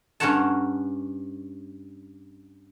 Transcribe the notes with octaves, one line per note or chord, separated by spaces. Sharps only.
G2 C#4 A#4 C#5 F#5 A5